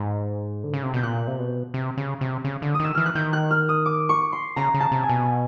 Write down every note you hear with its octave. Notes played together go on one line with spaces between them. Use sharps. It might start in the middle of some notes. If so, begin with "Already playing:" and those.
Already playing: G#2
D3
C#3
C3
B2 G6
A#2 F#6
C3
B2
C3
C#3
C3
C#3
D3
D#6
D#3 E6
E3 F6
F#6
D#3 G6
F#6
F6
D#6
D6
C#6
C6
C#3 A#5
C#3
A5
C3
G#5
B2